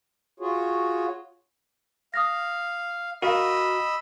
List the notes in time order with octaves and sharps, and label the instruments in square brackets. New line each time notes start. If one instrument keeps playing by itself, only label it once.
[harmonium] F4 F#4 G#4 C#5
[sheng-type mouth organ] F5 [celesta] D#6 F6 A#6
[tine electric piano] F#4 [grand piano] A#4 F5 [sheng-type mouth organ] D#5 B5 E6